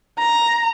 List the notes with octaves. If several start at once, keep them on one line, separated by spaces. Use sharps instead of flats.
A#5